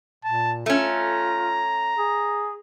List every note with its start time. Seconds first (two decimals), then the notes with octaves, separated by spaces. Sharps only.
0.24 A#2 A5
0.66 A3 C#4 F4 A#5
1.98 G#4